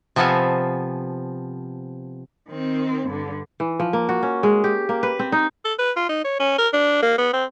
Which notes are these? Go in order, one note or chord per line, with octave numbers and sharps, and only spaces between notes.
C3 F3 B3 A4 F5 G#5
D#3 C4
G2 D3
E3
F3
A#3
F#4
C#4
G#3
G4
A#3
B4
C4
D#4
A4
B4
F4
D#4
C#5
C#4
A#4
D4
A#3
B3
C4